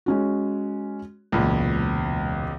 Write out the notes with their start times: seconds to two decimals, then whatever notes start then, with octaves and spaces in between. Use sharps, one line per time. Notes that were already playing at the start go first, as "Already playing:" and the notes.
0.06 G#3 C#4 F#4
1.32 E1 C#2 A#2 B5